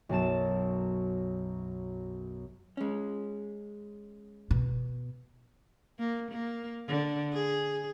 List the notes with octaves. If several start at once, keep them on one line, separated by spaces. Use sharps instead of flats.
B1 F#2 A5 E7
G#3 C#4
B2
A#3
A#3
D3
G#4